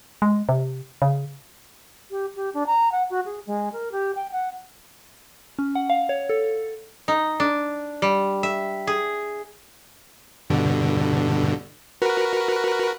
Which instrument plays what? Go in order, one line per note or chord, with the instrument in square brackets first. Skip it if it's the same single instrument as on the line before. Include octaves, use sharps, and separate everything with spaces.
[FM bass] G#3
C3
C#3
[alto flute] G4
G4
D4
A#5
F#5
F#4
G#4
G#3
A#4
G4
G5
F#5
[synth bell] C#4
F#5
F5
C#5
A4
[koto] D#4
D4
G3
E5
G#4
[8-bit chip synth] G2 B2 D3
F#4 A#4 B4